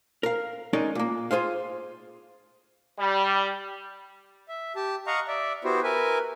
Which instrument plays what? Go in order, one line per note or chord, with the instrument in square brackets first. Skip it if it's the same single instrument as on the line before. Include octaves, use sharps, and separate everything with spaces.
[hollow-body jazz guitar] A#4 F5
G#3 C#4 D#4 A#4 D5
A#2 A#3
F4 G#4 C5 F5
[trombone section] G3
[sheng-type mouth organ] E5
G4 A5
D#5 F5 F#5 A#5 C#6
D5 E5
B3 E4 F#4 G4 C5
A#4 B4 E5 G#5